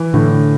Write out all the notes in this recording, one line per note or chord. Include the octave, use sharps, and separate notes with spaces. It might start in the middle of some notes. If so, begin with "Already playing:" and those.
Already playing: E3
A2 D3